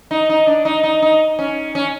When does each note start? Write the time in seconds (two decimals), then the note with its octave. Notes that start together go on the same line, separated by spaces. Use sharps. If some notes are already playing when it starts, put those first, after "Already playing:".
0.11 D#4
0.30 D#4
0.47 D4
0.65 D#4
0.84 D#4
1.02 D#4
1.39 C#4
1.75 C#4